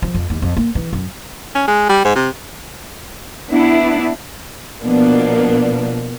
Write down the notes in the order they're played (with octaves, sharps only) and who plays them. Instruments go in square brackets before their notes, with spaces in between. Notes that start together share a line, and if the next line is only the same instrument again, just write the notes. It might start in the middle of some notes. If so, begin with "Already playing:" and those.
[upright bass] F3
F2
D#2
F2
A#3
E3
F#2
[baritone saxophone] C#4
G#3
G3
G#2
C3
[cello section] B3 D4 E4
[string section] B2 F3 A#3 B3 D4